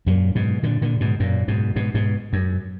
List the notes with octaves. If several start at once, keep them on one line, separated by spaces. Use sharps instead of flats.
F#2 A#2
G#2 B2
A#2 D3
A#2 D3
G#2 B2
F#2 A#2
G#2 B2
G#2 B2
G#2 B2
F#2